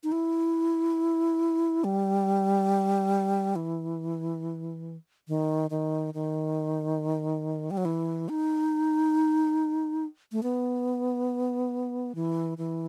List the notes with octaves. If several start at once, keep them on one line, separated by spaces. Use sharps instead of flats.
D#4
E4
G3
E3
D#3
D#3
D#3
G3
F#3
E3
D#4
A3
B3
E3
E3